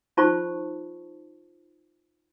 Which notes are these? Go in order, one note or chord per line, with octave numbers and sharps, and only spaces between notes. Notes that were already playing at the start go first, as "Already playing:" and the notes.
D#4 F4 C5 A5 B5 C#6